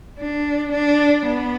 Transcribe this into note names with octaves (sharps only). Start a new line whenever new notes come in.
D4
D4
B3